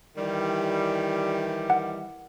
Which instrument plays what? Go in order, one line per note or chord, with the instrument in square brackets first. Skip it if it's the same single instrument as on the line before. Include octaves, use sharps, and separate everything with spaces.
[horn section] D#3 E3 G3
[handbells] F#5